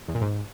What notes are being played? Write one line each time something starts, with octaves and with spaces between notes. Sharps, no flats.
E2
A#2
G#2